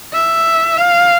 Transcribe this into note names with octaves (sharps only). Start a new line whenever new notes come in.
E5
F5